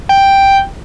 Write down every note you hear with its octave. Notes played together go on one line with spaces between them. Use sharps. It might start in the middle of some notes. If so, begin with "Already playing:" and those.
G5